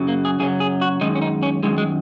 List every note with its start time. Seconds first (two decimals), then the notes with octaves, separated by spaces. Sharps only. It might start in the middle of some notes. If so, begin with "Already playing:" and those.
Already playing: F#2 C#3 F#3
0.08 A#3
0.25 G#4
0.40 F#2 C#3 F#3 G#4
0.60 G#4
0.81 F#4
1.01 F#2 D#3 G#3 D#4
1.15 C#4
1.22 D#4
1.43 C#4
1.63 F#2 D#3 G#3
1.78 G#3